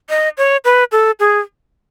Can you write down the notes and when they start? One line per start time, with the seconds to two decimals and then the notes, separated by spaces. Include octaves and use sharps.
0.10 D#5
0.38 C#5
0.65 B4
0.92 A4
1.20 G#4